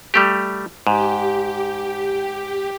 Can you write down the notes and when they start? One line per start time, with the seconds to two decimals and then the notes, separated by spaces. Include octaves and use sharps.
0.14 G3 A3 G4
0.87 G#2 G4